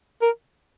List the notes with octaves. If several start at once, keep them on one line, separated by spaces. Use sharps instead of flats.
A#4